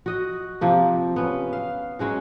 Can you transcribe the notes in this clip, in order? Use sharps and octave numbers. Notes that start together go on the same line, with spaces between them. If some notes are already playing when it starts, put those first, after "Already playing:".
F#4 D#5
C3 F3 A#3
B3 C#4
F5
F#3 G#3 C#4 F#4